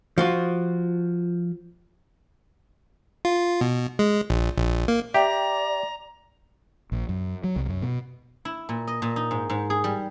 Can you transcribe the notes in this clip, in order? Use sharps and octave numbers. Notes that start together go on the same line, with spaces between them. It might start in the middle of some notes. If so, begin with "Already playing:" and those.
F3 F4 F#4
F4
B2
G#3
A#1
A#1
A#3
G4 D5 E5 G5 A#5
A#1
F#2
F#3
C2
F#2
B2
E4
A#2
D#5
A#2
D#4
G#2
G#2
G#4
G3